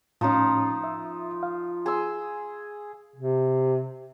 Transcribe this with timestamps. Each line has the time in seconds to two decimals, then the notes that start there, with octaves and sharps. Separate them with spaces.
0.21 A2 F3 C#4 D#4 F4
0.84 E5
1.43 F5
1.86 G#4 C6 E6
3.16 C3